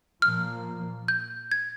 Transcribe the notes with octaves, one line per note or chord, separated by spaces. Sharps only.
A#2 F3 A#3 F6
G6
G#6